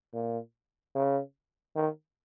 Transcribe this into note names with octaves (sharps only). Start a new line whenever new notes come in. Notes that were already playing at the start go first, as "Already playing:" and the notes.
A#2
C#3
D#3